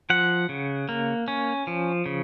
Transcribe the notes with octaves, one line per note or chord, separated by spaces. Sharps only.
F3 F#5
C#3
A#3
C#4
F3
C#3